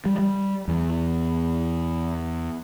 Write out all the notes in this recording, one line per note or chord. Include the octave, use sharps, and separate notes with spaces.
G3
G3
E2